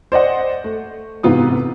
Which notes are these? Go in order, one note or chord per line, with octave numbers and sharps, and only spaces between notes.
C5 D5 D#5 F#5
A3
G#2 C3 E3 B3 F4 D#6